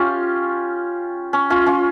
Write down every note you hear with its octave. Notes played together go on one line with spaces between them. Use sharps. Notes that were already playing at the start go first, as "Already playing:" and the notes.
Already playing: C#4 F4 G4
C#4
C#4 F4
C#4 F4